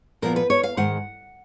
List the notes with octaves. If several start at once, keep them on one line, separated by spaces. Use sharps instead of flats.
A#2 F3 B3 A#4
B4
C#5
F5
G#2 D#3 G#3 F#5